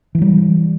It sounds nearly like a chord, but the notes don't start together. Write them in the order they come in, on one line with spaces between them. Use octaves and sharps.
E3 F3 G3